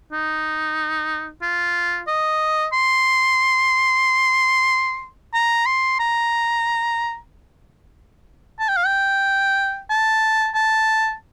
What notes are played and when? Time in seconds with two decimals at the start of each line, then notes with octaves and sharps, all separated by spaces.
0.12 D#4
1.42 F4
2.07 D#5
2.73 C6
5.34 A#5
5.66 C6
5.99 A#5
8.59 A5
8.69 G5
8.77 F5
8.86 G5
9.90 A5
10.55 A5